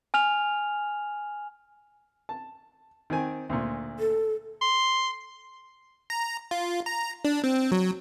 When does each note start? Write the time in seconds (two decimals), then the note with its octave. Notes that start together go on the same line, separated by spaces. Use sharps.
0.14 G#5 F6 F7
2.29 A5
3.10 D#3 C4 G#5
3.49 D2 A#2
3.99 A4
4.61 C6
6.10 A#5
6.51 F4
6.86 A#5
7.25 D4
7.44 C4
7.72 F#3